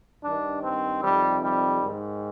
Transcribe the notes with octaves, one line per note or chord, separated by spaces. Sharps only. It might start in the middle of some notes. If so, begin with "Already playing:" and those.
G2 D#3 D4
C4
F2 C3 D#3 G3
G3
G#2 D#3